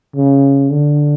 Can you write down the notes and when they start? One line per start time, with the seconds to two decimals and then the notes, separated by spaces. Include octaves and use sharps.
0.16 C#3
0.70 D3